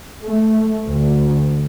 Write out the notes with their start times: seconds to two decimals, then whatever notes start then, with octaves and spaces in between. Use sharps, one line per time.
0.25 A3
0.86 D2